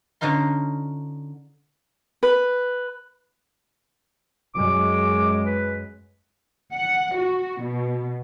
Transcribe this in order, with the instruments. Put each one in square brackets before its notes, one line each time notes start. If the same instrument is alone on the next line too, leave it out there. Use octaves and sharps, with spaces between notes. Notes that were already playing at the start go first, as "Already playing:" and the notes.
[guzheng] D3 C#4 D#4 F4 C6
[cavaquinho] B4
[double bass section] F#2 G#3 [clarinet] D6
[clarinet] B4
[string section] F#5
F#4
B2